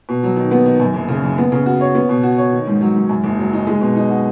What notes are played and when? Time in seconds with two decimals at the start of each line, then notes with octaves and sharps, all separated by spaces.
0.09 B2
0.23 F#3
0.36 D#3
0.51 B3
0.66 D#3
0.80 F#2
0.94 F#1
1.08 C#3
1.24 F#1
1.38 B3
1.52 C#3
1.66 F#4
1.81 C#5
1.95 B3
2.09 B2
2.23 F#4
2.38 C#5
2.53 D#3
2.67 G#2
2.81 F#3
2.96 G#2
3.09 F#2
3.24 F#1
3.39 F#3
3.53 D#4
3.67 G#3
3.81 B2
3.96 D#4
4.10 F#4